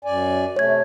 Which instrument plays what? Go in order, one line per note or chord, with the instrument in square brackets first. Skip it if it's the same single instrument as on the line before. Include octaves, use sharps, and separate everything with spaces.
[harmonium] F#2 D5 G#5
[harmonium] C3 A3 [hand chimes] C#5 G#6